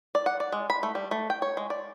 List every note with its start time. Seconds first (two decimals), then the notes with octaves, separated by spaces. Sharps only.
0.15 D5
0.26 F#5
0.40 D5
0.52 G#3
0.70 B5
0.83 A3
0.95 G3
1.11 A3
1.30 G5
1.42 C#5
1.57 G#3
1.70 D5